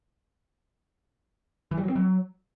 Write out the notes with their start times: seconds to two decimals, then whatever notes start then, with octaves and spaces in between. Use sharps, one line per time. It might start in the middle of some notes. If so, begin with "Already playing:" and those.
1.71 E3
1.77 G3
1.83 F#3
1.90 C4
1.96 F#3